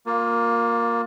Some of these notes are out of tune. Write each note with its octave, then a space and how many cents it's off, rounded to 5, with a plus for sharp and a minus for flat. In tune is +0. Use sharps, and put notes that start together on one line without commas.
A#3 +0 F4 +25